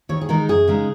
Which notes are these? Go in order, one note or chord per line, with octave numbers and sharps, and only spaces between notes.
D#2 C#5
G#4
D#3 G#3 D#4 A#4
F#2 G#4
C#3 G#3 D#4